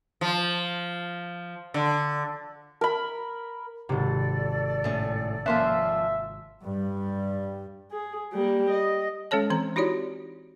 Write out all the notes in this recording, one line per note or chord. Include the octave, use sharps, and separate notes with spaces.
F3
D3
A#4 B5
G#1 C3 A4 D5
A2 C#4
F3 A#3 C#4 E5 F5 C6 F#6
G2 G3
G#4
G3 A#3
D#5
G#3 C#4 A4 C#5 A5
E3 C4 A#5
D#4 E4 F#4 G4 C#5 D5